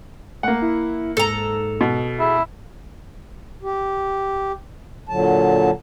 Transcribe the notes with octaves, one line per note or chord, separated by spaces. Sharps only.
A3 A#3 F#5
E4
G#2 A4 A#5
B2
E4 G#4
G4
A#2 D3 F#3 A5